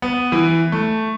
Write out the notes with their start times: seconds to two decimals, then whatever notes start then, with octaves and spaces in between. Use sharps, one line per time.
0.02 B3
0.32 E3
0.72 A3